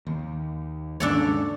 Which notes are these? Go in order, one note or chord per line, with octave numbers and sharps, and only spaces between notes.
D#2
D#2 G#2 C#3 D4 A4 C#5